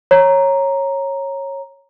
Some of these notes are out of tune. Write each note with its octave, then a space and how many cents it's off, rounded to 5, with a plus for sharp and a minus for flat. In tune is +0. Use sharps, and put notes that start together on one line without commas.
C#5 -15 A#5 +0